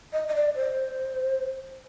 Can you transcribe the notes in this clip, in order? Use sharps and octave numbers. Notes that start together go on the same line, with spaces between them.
D#5
D#5
D5
C5